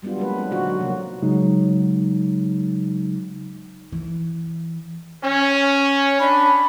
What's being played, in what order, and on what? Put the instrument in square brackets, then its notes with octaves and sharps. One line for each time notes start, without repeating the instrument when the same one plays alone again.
[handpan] F#3 G3 B3 D4 F4
F3 G#3 A#3 B4
C4
A#2 D3 D#4 F4 F#4 F#5
F#3
C3 F3 A#3
[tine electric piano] C#3 F#3 G#3 D#4
[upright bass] E3
[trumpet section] C#4
[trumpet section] D4 [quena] B5